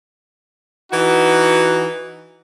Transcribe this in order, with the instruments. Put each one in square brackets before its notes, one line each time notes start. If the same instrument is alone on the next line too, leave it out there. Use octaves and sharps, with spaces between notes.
[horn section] E3 D#4 F#4